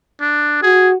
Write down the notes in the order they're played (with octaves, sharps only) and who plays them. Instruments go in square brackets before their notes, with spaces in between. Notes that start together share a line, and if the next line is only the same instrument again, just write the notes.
[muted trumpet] D4
[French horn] F#4 [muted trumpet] G#4